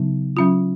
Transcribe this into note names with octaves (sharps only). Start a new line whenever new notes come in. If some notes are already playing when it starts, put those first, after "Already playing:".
Already playing: C#3 F#3 B3 D#4
F#3 C#4 F4